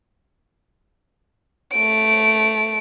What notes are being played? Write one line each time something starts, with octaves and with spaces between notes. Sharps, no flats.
A3 D7